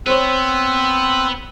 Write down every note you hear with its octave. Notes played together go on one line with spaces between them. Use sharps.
B3 C4 C5 C#5 E6 F#6